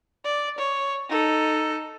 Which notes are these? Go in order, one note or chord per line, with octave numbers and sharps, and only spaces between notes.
D5
C#5
D#4 A4